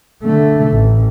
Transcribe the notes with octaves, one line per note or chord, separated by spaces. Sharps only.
D3 A3
A1